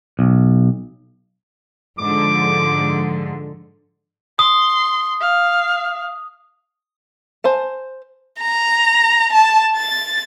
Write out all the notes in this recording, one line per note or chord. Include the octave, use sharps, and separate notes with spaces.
B1
G#2 D3 F3 D6
C6 D#6
F5
C5 G#5 A5
A#5
A5
A6